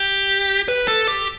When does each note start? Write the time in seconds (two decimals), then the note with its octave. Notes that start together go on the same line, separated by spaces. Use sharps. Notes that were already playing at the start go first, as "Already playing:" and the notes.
Already playing: G4
0.68 B4
0.88 A4
1.08 G4